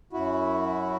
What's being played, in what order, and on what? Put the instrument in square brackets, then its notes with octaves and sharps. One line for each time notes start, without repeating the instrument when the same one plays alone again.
[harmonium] F#2 E4 F#4